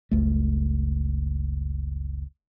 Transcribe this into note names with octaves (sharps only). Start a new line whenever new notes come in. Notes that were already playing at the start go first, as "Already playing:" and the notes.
F#1 C#2 A3